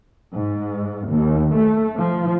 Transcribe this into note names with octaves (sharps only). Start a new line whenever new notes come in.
G#2
D#2
A3
F3